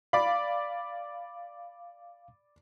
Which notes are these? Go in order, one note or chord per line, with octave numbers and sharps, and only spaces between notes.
D5 F5 B5